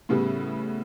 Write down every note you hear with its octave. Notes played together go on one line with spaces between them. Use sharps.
A2 C#3 G3 B3